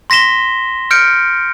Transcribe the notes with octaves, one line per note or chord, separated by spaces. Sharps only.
C6 A#6 B6 E7 G7
F6 G6 C#7 D7